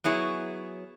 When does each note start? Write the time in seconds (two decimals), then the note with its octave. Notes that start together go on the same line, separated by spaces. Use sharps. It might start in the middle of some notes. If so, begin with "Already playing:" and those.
0.04 F#3 B3 E4 G#4 C#5